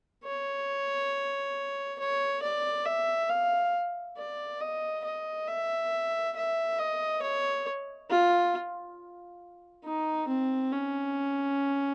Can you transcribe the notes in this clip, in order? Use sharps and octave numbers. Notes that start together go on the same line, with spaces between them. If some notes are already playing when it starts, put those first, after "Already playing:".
C#5
C#5
D5
E5
F5
D5
D#5
D#5
E5
E5
D#5
C#5
F4
D#4
C4
C#4